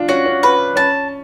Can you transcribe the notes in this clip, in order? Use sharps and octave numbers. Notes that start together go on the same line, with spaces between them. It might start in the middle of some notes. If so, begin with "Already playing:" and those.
Already playing: D4 F4
C#4 F#4
C#4
C#4 B4
C#4 A5